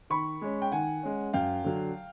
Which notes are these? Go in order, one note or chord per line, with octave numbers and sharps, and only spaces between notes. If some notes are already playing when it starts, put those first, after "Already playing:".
D#3 B5 C#6
G#3 C#4
G5
D#3 F#5 G#5
G#3 C#4
F#2 F5 G5
D3 F#3